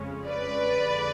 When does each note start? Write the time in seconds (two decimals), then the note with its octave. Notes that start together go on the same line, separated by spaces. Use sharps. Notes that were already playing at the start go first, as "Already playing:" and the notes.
Already playing: F2 C#3 G#3 C#4
0.27 B4 D5
0.75 F2 D3 G#3